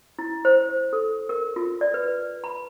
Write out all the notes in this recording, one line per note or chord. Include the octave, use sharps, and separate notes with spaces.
E4
C5
A4
A#4
F4
D5
B4
B5